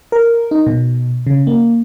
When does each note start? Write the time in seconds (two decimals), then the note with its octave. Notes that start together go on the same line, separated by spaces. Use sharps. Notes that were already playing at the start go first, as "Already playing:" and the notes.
0.12 A#4
0.51 D#4
0.66 B2
1.27 C#3
1.47 A#3